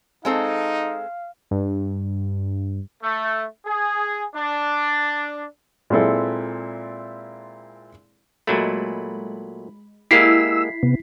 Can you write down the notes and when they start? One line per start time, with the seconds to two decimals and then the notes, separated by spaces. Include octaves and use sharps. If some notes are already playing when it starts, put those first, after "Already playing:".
0.25 G#3 C4 D#4 A4 F5
1.51 G2
3.02 A3
3.65 G#4
4.34 D4
5.90 A#2 G#3 C4 E4 A4
8.47 A#2 F#3 G#3 A3 B5
10.11 G#3 A#3 E4 G4 E6 B6 C7
10.83 C3 B3